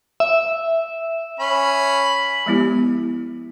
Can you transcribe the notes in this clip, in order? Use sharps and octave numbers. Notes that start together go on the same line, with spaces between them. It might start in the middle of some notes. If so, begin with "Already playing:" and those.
E5
C#4 B5
F3 G#3 B3 E4 G4